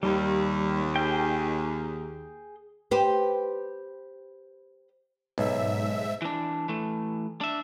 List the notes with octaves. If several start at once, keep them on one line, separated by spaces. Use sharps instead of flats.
D#2 G3
G#4 G5
G4 B4 C5
B1 G#2 E5
E3 D4
E3 A3
D4 E5